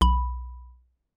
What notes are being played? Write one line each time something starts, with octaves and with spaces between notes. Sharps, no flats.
B1 B5